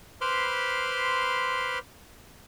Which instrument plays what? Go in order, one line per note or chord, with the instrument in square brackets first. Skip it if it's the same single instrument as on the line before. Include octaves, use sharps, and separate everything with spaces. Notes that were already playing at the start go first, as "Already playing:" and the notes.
[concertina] B4 C5 B5 C6 D6 F6